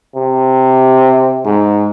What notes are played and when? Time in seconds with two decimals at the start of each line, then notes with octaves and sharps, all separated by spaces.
0.15 C3
1.45 G#2